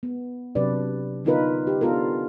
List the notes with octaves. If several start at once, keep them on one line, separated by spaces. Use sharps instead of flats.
B3
C3 F#3 D4 G4 B4 D5
D3 B3 D#4 F4 A#4 B4
G4
B3 D4 F4 A4 A#4